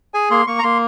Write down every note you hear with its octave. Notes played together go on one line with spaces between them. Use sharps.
G#4 G#5
A#3 C6
A#3 C#6
A#5
A#3 C6